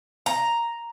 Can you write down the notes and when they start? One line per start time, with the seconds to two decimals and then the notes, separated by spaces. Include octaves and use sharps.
0.26 A#5